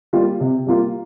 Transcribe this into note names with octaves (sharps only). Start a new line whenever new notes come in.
G3 A#3 F4
C3
G3 A#3 F4